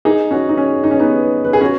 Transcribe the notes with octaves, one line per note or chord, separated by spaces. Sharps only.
D#4 G#4
C#4 F#4
D#4
C#4
D#4
C#4
B3 D#4
B4
G#4
C#4 F#4